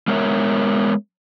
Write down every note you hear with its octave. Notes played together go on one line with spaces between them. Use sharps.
G#3 B3 A#4 C#5 E5